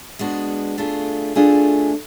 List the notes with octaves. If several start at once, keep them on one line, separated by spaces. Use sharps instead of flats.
G#3 B3 D4 F#4
A3 D4 F4 G#4
A3 D4 F4 G#4